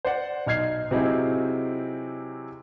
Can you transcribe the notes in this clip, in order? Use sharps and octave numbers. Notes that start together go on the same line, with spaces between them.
C5 D5 F#5
B1 D#4 F6 G#6 C7
C3 F#3 C4 D#4 E4 G#4